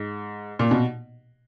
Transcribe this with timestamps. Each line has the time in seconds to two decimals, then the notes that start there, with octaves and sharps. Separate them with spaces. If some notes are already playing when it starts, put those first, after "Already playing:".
Already playing: G#2
0.59 A#2
0.71 B2